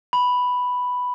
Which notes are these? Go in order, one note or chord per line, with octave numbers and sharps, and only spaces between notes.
B5